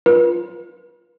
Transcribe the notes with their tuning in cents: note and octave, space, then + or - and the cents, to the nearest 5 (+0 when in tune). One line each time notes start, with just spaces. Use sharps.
F4 +0 B4 -40